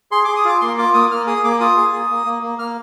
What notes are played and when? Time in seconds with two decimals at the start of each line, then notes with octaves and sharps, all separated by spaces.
0.11 G#4 C6
0.25 G#4 D6
0.36 D#6
0.45 F4 D6
0.61 A#3 C6
0.78 F4 D6
0.94 A#3 D#6
1.11 A#3 F6
1.27 G#4 D#6
1.44 A#3 D6
1.60 F4 D#6
1.77 G#4
1.93 A#3
2.10 A#3
2.26 A#3
2.42 A#3
2.59 A#3 F6